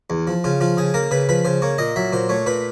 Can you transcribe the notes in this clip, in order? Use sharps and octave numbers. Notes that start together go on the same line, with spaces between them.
E2
F3
C#3 F4
F3 F4
C#3 G#4
A#3 A#4
C#3 B4
F3 B4
C#3 C5
A#3 C#5
A#2 D#5
F#3 E5
A#2 C5
A3 C#5
A#2 B4